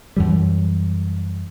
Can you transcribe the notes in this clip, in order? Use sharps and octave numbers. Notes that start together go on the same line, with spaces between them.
F#2 E3 G3